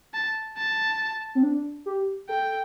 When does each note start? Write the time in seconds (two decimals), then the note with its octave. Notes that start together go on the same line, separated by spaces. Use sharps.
0.14 A5
0.57 A5
1.35 C4
1.43 D4
1.86 G4
2.29 A4 G5